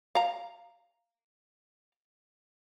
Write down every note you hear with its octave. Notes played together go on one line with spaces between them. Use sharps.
F5 A#5